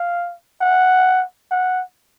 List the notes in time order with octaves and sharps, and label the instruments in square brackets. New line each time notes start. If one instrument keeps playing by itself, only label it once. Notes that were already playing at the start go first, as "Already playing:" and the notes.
Already playing: [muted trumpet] F5
F#5
F#5